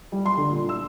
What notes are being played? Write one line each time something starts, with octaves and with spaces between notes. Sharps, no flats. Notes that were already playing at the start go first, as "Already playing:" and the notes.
G3
C6
D3
A#2
E6